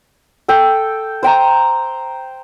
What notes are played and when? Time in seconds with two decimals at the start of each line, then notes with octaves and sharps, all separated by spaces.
0.48 A4 G5
1.23 C5 G5 A#5